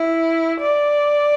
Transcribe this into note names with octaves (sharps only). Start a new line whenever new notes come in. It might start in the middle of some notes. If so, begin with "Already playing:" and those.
Already playing: E4
D5